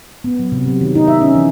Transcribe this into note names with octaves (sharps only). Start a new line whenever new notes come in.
B3
F#3
C3
F#3
D#3
D#4
E5
C#4
E3